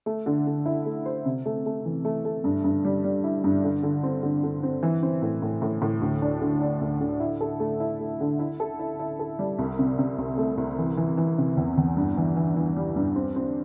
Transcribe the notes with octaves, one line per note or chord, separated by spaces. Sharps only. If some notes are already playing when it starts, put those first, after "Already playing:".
A3
D3
D3
E4
A3
C5
C3
A3
A3
E3
A3
A3
G2
G2
G3
G3
E4
G2
D3
D3
C4
D3
D3
C4
E3
C4
A2
A2
A2
A2
D2
D4
D3
D4
D2
D3
E4
A4
A3
E4
A3
D3
E4
A4
E4
E4
A4
G3
C2
C3
C3
C2
A3
C2
E3
E3
E3
C3
E2
E2
G2
E3
E3
E3
G3
G2
C4
C4